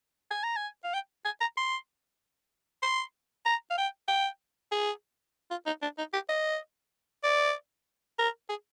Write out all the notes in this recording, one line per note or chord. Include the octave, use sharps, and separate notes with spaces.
G#5
A#5
G#5
F5
G5
G#5
A#5
C6
C6
A#5
F5
G5
G5
G#4
F4
D#4
D4
D#4
G4
D#5
D5
A#4
G#4